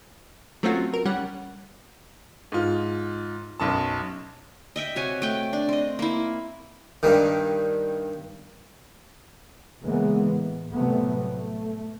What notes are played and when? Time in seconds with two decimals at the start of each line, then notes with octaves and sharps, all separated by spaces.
0.63 F#3 A3 C4 C#4 F4 F#4
0.93 A#4
1.05 G3 C#4 F#5
2.52 G#2 F4
3.60 B1 F#2 A5
4.76 D#5 E5 G5
4.96 C3 F#4 C#5 G#5
5.22 A3 G5
5.53 D4
5.69 C4 D#5
5.99 A#3 E4
7.03 G2 D#3
9.83 C#3 E3 G#3 A#3 B3
10.25 A2
10.74 A2 C3 F#3 G3 A3 B3
11.33 A3